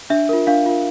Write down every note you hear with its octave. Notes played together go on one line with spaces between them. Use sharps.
D4 E5
F4 A#4
D4 F5
F4 A#4